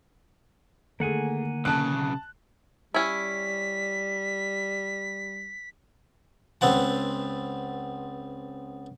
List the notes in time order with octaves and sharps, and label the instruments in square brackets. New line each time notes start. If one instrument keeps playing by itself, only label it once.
[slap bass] D3 D#3 [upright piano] A3 G#4 [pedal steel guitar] A#3 F#5 G#5
[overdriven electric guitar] B1 C#3 [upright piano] A5 F#6
[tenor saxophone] G3 [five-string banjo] C#4 E4 [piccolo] B6
[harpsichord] C#2 B3 C4 F#5 A5